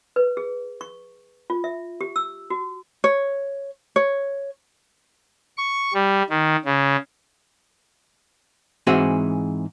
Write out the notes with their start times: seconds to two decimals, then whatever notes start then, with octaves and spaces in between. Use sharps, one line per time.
0.16 B4
0.37 G#4
0.81 C#6
1.50 F4
1.64 E5
2.01 G4
2.16 E6
2.50 F#4
3.04 C#5
3.96 C#5
5.57 C#6
5.94 G3
6.30 D#3
6.65 C#3
8.87 G#2 E3 C4 F#4 G#4 E5